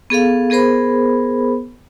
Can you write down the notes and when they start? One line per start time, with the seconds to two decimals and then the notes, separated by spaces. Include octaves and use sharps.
0.10 B3 G#4 A4 F5
0.50 B3 G#4 A#4 C5 B5